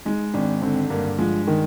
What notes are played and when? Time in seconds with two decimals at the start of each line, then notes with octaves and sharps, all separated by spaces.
0.05 G#3 D#4
0.34 G#1 D4
0.62 D3 C4
0.90 G2 A#3
1.18 F3 G#3
1.47 D#3